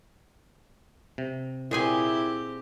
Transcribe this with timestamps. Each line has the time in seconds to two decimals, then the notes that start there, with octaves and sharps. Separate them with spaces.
1.18 C3
1.71 A#2 C4 E4 G4 G#4 G#5